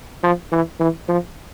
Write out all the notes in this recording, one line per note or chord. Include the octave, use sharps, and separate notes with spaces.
F3
E3
E3
F3